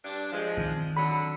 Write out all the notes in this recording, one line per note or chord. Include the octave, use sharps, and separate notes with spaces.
G2 D4
F3 G#3
D#3 C4
D3 F#3 B5